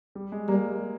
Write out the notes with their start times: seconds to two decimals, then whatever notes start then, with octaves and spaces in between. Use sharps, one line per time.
0.15 G3
0.32 G#3
0.48 G3 A#3